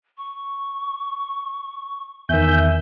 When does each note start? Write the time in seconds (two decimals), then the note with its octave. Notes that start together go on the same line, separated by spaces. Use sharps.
0.18 C#6
2.29 E2 D#3 E5 G#5 G6